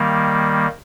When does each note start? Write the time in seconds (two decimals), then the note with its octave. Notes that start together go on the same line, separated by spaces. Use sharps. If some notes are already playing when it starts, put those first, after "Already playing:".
Already playing: D#3 G3 A#3